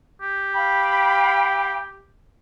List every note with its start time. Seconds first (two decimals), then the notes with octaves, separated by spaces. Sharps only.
0.22 G4
0.54 F5 G5 B5